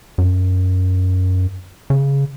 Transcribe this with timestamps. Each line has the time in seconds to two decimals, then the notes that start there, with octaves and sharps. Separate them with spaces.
0.18 F#2
1.90 C#3